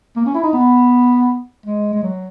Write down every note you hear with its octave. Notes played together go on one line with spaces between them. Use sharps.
A#3
C#4
E4
D#4
B3
G#3
G#3
F#3